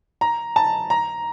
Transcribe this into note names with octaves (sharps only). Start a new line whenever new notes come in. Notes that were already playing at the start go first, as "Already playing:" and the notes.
A#5
A5
A#5